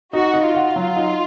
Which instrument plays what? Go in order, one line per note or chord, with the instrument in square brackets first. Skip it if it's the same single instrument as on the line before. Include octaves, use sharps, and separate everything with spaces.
[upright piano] D#4 [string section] F#4
[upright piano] D#4
[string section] F4
[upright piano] F#4
F#3
D#4